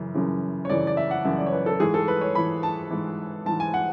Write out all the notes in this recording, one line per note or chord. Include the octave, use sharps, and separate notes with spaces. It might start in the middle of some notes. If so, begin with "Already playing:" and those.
Already playing: F#2 C#3 E3
F#2 C#3 E3
C#5
F#2 C#3 E3 D5
D5
E5
F#5
F#2 C#3 E3 E5
D5
C#5
B4
A4
G#2 E3 G#4
A4
B4
C#5
G#2 E3 B5
A5
G#2 E3
G#2 E3 A5
G#5
F#5